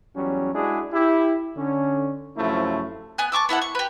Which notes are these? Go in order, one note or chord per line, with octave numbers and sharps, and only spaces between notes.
E2 F#3 G3 C#4
G#3 D4 E4 F#4 G#4
E4 G4
D3 C#4
F#2 C3 F3 A3 C#4 E4
B3 G#5 F#6
A5 C#6 D6 E6
B3 E4 A4 F#5
C#6
G4 B4